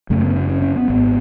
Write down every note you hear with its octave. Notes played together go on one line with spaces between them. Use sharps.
F#1 F#2 C#3 A3
B3
C#4
C#4
C#4
B3
G#1 G#2 B3